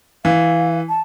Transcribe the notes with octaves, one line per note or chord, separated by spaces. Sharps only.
E3 F5
A5